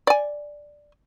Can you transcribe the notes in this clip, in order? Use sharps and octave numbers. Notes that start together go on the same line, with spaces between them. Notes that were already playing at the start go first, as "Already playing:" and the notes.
D5 G#5